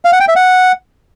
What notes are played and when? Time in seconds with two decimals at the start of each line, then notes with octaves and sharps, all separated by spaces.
0.05 F5
0.13 F#5
0.20 G5
0.28 E5
0.36 F#5